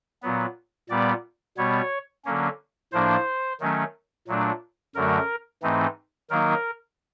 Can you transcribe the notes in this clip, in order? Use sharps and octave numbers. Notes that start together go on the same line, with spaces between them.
A#2 F#3 B3
A#2 G3 B3 D5
B2 G3 B3 C#5
D3 F#3 A#3 C#4
A2 F3 A#3 D4 C5
D#3 F#3 A3 C#4
A#2 F#3 A3 D4
F#2 D3 F#3 A3 A#4
G#2 E3 A3 C4 D#4
D#3 F#3 A#3 D#4 A#4